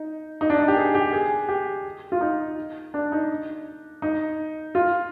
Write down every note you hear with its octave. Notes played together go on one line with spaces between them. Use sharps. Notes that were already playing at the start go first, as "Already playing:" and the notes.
Already playing: D#4
D#4
D4
D#4
G4
G#4
G4
G#4
G4
F4
D#4
D4
D#4
D#4
F4